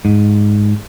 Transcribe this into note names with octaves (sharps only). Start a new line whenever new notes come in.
G#2